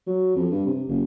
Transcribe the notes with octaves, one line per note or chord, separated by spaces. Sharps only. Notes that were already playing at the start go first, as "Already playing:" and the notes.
F#3
F2
G2
C3
F#1